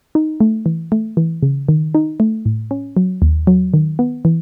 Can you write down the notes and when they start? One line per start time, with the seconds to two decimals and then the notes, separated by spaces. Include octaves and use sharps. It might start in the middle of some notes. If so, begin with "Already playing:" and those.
0.15 D#4
0.40 A3
0.66 E3
0.92 A3
1.17 E3
1.43 C#3
1.69 D#3
1.95 D#4
2.20 A3
2.46 A2
2.71 C#4
2.97 F#3
3.22 D#2
3.47 F#3
3.74 D#3
3.99 B3
4.25 E3